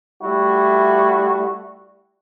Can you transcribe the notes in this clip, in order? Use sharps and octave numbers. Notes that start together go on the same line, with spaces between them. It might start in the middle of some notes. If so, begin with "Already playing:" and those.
G3 A3 E4 F#4